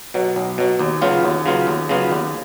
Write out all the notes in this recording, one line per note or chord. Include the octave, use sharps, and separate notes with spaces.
B2 F#3
B1
B2 F#3
D#2
C#3 F#3 B3 F4
D#2
C#3 F#3 B3 F4
D#2
C#3 F#3 B3 F4
D#2